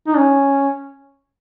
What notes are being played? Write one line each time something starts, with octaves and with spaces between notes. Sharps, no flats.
D#4
C#4